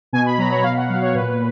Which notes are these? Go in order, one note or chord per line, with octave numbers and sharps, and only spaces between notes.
B2 G#5
B5
F#3 A#5
C#5
B2 F5
F#5
F#3 F5
C#5
A#2 B4